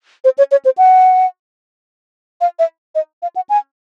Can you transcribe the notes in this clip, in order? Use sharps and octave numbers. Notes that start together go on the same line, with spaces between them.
C5
C#5
C#5
C5
F#5
F5
E5
D#5
F5
F#5
G#5